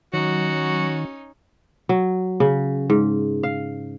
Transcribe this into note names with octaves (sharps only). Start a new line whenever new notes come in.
D#3 F#3 C#4 D#4 F#4
F#3
C#3
G#2
F5